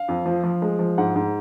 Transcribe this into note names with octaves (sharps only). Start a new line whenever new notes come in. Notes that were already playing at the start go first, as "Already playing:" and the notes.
Already playing: F5
F2
F3
F3
G#3
F3
G#2 F#5
G#2